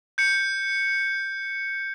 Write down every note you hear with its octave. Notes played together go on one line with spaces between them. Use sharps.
G6 C#7